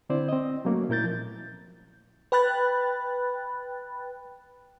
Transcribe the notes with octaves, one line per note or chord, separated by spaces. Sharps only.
D3 C4 E4 C5 D5
C4 D#5
F#3 A3 A#3 C#4 F#4
A#2 E4 A#4 G6 A6
F3
B4 G5 B5 F#6 A6